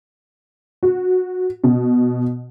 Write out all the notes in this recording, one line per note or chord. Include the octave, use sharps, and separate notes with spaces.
F#4
B2